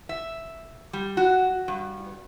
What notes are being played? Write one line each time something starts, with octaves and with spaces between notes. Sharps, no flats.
E5
G3
F#4
G2